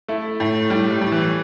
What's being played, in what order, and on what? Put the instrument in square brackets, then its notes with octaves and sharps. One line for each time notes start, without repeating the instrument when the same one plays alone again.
[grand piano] A3 [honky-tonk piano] E4
[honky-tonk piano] A2
[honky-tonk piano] A2 [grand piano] G3
[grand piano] G3
[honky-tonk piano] A2
[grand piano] E3